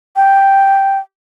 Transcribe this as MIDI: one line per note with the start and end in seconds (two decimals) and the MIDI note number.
0.16 0.98 79